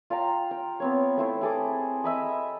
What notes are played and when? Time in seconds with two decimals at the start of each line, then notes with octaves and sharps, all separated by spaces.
0.10 F4 F5 G5 A#5
0.51 G5
0.80 B3 C4 C#5
1.17 A3 E4 C5
1.41 E4 G#4 A4 D6
2.04 D#5 E5 B5 D#6